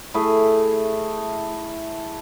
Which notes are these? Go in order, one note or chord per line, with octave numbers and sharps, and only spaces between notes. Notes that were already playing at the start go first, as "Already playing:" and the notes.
A3 E4 G#4